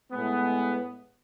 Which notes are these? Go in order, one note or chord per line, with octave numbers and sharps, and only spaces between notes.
A2 G#3 B3